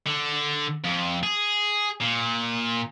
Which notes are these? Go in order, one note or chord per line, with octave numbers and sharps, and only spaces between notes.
D3
F2
G#4
A#2